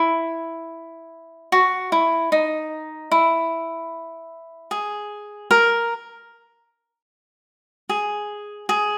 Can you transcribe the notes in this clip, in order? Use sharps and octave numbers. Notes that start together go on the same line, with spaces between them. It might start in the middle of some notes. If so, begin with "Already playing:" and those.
Already playing: E4
F#4
E4
D#4
E4
G#4
A#4
G#4
G#4